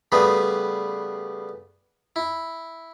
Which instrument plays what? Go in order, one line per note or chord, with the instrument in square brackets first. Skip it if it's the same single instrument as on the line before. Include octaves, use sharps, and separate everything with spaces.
[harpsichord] C#3 G3 A3 B3 G#4 B4
E4